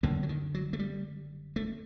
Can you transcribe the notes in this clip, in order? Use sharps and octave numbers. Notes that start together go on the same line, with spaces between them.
F#1 F#2 D3 A#3
F#3
D#3
F#3
A3
G3
A3